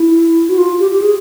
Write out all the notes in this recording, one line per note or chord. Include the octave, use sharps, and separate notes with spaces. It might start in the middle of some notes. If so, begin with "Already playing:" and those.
Already playing: E4
F#4
F4
G4
G4
G#4